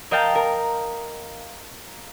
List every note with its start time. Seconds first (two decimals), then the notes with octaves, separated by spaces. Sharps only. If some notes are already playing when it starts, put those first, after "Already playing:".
0.11 A#4 D#5 F5 G5 A5
0.35 A#4